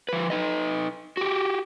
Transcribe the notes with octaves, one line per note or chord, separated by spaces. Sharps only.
F3 B4
D#4 B4 D#5
F#4 G4